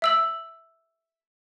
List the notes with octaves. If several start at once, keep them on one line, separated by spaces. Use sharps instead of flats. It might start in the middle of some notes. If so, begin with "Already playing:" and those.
E5 E6 F#7